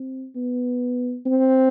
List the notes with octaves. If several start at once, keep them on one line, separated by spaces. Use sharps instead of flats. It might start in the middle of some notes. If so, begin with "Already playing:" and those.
Already playing: C4
B3
C4